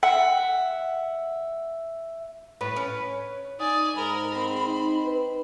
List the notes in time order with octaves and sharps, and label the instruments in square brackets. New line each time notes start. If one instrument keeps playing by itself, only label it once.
[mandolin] E5 F#5
[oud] A2 [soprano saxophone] B4
[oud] C#4
[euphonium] D#4 [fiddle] D5 G#5 [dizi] D#6
[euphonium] G#2 [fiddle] A#4 [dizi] B5
[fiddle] C4
[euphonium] D#4
B4